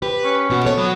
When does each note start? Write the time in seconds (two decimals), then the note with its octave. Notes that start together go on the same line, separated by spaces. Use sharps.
0.02 G4 B4
0.24 C#4
0.50 B2 B3 F#4
0.63 A#2 A4 C#5
0.78 F#3 B3